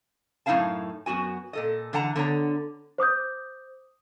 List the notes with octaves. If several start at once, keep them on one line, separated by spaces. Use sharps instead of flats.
F#2 A2 D#4 E4 F5 A5
F#2 B3 F#4 G#5
A#2 A4 D#5
D3 E3 F#5 A5 A#5
D3 B3 C#5 A#5
C5 D6 D#6 G6